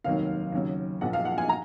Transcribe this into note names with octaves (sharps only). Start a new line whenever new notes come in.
F1 D#2 D#3 F#3 F5
D#2 C#3 F#3
A#1 A#2 F3 F#5
F5
F#5
G#5
A#5